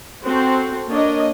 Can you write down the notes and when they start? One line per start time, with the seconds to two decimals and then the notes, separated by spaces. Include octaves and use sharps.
0.24 C4 F#4 A4 C5
0.90 A#3 D4 C#5 D#5